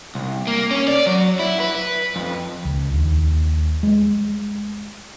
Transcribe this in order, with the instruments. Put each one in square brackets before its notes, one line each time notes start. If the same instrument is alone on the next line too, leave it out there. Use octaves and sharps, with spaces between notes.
[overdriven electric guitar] C2
A#3
C#4
D5
F#3
E4
B4
F2
[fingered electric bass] C#2
D#2
G#3